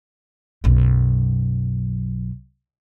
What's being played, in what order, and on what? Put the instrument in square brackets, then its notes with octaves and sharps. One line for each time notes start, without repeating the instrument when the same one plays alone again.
[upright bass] B1 F#2